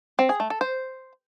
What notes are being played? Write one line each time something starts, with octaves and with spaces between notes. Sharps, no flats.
C4
G#4
A3
A4
C5